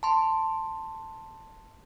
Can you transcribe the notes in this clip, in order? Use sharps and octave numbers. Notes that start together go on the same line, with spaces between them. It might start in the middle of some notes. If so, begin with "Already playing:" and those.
A5 C6